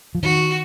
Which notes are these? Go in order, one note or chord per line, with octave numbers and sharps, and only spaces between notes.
F3
D#3 F#4